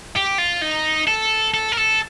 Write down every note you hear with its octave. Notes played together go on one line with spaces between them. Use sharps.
G4
F4
D#4
A4
A4
A#4
A4